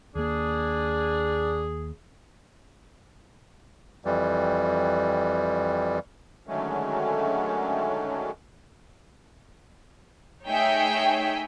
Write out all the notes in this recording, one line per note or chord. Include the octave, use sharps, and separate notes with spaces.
D#2 A#3 D4 G#4
F2 E3 G3
D3 D#3 F#3 G#3 A3 C#4
A3 D#4 G#4 C#5 E5 G5